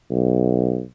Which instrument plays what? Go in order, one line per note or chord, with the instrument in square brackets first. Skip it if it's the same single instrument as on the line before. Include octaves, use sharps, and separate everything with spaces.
[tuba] B1